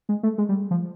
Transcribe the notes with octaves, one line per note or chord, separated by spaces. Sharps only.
G#3
A3
G#3
G3
F3